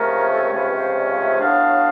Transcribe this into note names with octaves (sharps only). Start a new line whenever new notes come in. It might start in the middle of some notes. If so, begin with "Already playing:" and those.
Already playing: C#2 C3 F3 A3 C#4 A#4
A4
A#4
C#2 C3 F3 A3 C#4 B4
C5
D5
F5
E5
A2 F#3 B3 D4 F5